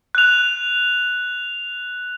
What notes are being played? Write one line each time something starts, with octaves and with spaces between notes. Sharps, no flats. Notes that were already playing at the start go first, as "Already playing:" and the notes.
F#6 F7